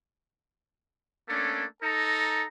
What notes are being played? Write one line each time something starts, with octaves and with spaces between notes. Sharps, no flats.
A3 A#3 C#4 D4 A4
D#4 A4 A#5